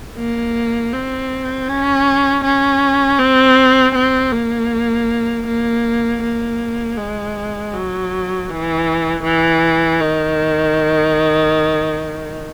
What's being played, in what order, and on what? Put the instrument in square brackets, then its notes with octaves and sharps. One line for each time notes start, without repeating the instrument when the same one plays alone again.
[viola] A#3
C4
C#4
C#4
C4
C4
A#3
A#3
A#3
G#3
F#3
E3
E3
D#3